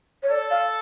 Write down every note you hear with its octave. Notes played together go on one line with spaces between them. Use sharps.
C#5
A4 D5
F5